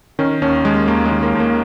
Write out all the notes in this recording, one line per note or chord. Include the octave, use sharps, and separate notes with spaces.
D#3 C#4
D#2 C#4
D#2 G#3
D#2 A#3
G#3
D#3
A#3
D#2
A#3